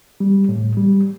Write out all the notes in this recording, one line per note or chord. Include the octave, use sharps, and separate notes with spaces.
G3
A2
G3